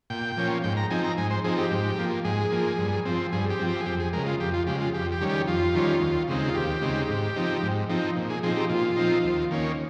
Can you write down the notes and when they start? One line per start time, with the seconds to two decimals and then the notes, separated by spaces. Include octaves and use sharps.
0.10 A#2 G5
0.37 F3 A#3 C#4
0.64 G#2 G5
0.77 A#5
0.90 F3 C4 D#4 G#5
1.04 A#5
1.17 G#2 G#5
1.30 C5
1.44 F3 C4 D#4 G#4
1.58 G4
1.71 G#2
1.98 F3 A#3
2.25 G#2 G#4
2.52 F3 A#3
2.78 G2
3.05 F3 C4
3.33 G2 G#4
3.50 G4
3.59 F3 C4
3.68 G4
3.80 G#4
3.86 F2 G4
4.00 G#4
4.13 C#3 G#3 A#4
4.26 F4
4.40 F2 G4
4.54 F4
4.67 C#3 G#3 G4
4.81 F4
4.94 F2 G4
5.12 G4
5.21 D#3 G3 C#4
5.29 G4
5.47 F2 F4
5.74 D#3 G3 C#4
6.01 D#2
6.28 C#3 G#3 C4 D#4
6.48 F4
6.55 D#2 G4
6.82 C#3 G#3 C4 D#4
7.09 G#2
7.36 F3 C4 D#4
7.63 G#2
7.89 F3 C4 D#4
8.16 A#2
8.30 G#4
8.43 F3 C4 D#4 G#4
8.56 G4
8.70 A#2 F4
8.97 F3 C4 D#4
9.24 D#2
9.51 D#3 A#3 C#4